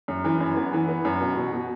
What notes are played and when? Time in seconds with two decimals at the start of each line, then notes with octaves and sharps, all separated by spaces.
0.08 F#2
0.24 E3
0.40 F#2
0.56 B3
0.73 E3
0.88 B3
1.05 F#2
1.21 B2
1.37 B2
1.53 B2